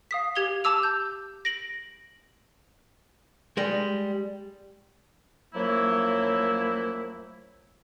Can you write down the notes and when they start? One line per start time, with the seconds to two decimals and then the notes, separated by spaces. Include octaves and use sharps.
0.11 F5 D#6 B6
0.35 G4 G#6 F7 G7
0.64 A5 D6 E6 F7
0.83 G6
1.45 A#6 D7 F#7
3.57 G3 G#3
5.54 F#2 F3 F#3 A3 A#3 E4